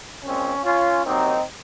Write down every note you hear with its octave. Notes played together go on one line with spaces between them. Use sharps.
A#2 G#3 C4 C#4
C#4 F4
C3 F#3 A#3 C4 D#4